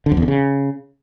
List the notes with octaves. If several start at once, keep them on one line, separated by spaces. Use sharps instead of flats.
D3
F2
E2
D3
C#3